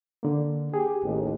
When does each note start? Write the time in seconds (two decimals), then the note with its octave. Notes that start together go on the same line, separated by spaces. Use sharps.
0.23 D3 A#3
0.74 G4 G#4
1.03 A1 D#2